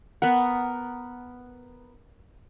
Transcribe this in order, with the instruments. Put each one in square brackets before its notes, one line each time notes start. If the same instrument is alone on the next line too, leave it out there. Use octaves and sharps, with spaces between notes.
[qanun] B3 A#4 [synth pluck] F#5